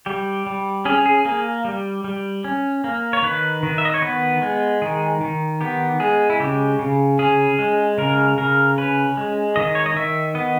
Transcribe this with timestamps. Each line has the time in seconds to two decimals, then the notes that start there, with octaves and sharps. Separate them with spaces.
0.06 G3 G4
0.47 G3
0.85 C#4 G#4
1.06 G#4
1.25 A#3 G#4
1.65 G3
2.04 G3
2.44 C#4
2.84 A#3
3.13 C#5
3.23 D#3 B4
3.63 D#3
3.78 E5
3.85 D#5
3.94 C#5
4.02 B3 B4
4.42 G#3
4.82 D#3 G#4
5.21 D#3
5.61 B3 G4
6.00 G#3 G#4
6.30 E4
6.40 C#3 G4
6.79 C#3
7.19 C#4 G#4
7.59 G#3
7.98 C#3 A#4
8.38 C#3 A#4
8.78 C#4 B4
9.17 G#3
9.56 D#3 D#5
9.75 C#5
9.86 D#5
9.96 D#3 E5
10.35 B3 D#5